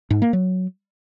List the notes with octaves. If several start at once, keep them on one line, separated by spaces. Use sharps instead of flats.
G#2
A#3
F#3